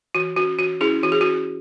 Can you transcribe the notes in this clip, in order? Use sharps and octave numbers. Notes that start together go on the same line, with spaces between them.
E3 F#4
C#4 F#4
E3 F#4
C#4 E4 G#4
E3 F#4
G#4
C#4 F#4